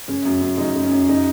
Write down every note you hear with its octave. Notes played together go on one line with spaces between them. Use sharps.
C#3 C#4
F#2
F#2
C#3 D#4
C#3
C#4
F#2
C#3 D#4